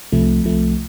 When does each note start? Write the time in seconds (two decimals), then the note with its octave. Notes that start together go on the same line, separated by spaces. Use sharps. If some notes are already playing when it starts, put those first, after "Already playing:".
0.12 C2 C3 F3 A3
0.44 C2 C3 F3 A3